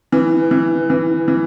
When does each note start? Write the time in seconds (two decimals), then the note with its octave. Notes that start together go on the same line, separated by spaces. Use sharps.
0.12 E3
0.51 E3
0.90 E3
1.28 E3